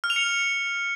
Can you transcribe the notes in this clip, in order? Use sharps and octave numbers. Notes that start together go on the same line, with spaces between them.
F6
F7
C#7